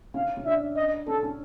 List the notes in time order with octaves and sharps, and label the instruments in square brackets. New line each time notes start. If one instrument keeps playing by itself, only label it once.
[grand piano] C#4 [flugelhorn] F5
[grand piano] C#4
[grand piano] D4 [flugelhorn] E5
[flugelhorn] D#5
[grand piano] C#4 [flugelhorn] A4
[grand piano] C#4